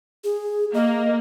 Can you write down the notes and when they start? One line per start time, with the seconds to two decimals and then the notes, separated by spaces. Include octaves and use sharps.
0.24 G#4
0.74 A#3 D#5